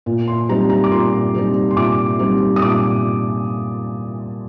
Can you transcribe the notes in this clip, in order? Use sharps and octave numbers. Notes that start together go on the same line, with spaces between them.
A#2
C6
G3 C4 D#4 A#5
A#5
D6
A#2 C6
G3 C4 D#4
C6
A#2 D6
G3 C4 D#4
D#6
A#2 D6